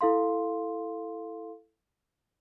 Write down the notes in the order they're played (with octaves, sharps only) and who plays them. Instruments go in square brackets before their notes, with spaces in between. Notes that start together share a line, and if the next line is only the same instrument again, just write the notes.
[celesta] E4 A4 F5 C6